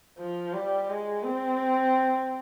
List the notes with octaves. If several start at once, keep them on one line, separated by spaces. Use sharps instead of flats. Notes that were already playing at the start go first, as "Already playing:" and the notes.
F3
G3
G#3
C4